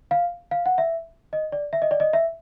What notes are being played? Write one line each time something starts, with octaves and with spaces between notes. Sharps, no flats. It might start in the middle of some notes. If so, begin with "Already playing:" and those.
F5
F5
F#5
E5
D#5
D5
E5
D#5
D5
D#5
E5